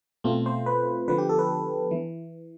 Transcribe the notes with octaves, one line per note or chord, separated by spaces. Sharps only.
B2 A3 C4 F4
C5
B4
D3 F3 B3 B4
G4
A4
B4
E3